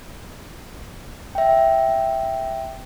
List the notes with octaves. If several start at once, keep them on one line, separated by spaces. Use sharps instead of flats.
E5 G5